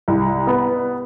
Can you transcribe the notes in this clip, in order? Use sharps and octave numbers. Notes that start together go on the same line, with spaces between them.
C2
B3